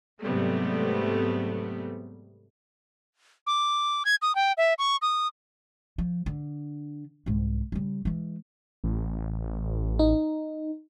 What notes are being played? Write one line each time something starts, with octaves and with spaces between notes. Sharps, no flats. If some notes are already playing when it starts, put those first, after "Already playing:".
G#2 C3 F#3 G3 A3 B3
D6
G#6
D#6
G5
E5
C#6
D#6
F3
D3
C2 G#2
C#3 G3
E3 G#3
A1
D#4